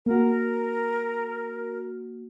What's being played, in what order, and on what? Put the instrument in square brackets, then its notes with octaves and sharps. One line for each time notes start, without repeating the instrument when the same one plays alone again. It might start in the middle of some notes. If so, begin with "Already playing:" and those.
[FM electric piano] A#3 F#4 [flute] A#4